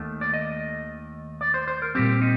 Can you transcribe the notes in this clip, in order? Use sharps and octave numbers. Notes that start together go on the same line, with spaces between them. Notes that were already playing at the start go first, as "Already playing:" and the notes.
Already playing: D#2 D#3 A3
D5
D#5
D5
C5
C5
A#4
A#2 G3 C4 G4
D#4